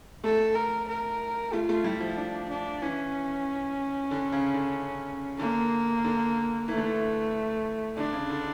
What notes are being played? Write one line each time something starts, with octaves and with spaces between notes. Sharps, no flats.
A3 A4
A#4
A#4
A3 F4
A3
G3 E4
F3
D4
D4
E3 C#4
D3
C#3
D3
D3 A#3
D3
E3 A3
D3
E3
D3 D4
C#3
D3